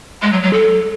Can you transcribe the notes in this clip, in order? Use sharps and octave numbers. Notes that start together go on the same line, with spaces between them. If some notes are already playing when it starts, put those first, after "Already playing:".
G#3
F#3
F#3
A4